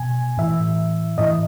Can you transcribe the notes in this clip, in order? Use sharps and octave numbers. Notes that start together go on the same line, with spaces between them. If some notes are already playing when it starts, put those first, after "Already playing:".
Already playing: B2 G#5
A2 E3 E5
A2 E3 D#5